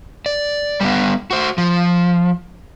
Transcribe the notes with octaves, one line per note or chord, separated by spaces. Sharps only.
D5
G3 A#3 B3
F#4 C5
F3